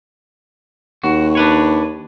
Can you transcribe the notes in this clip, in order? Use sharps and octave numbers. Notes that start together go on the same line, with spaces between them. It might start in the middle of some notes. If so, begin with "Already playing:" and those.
D#2 F#4
D4 B4 C#5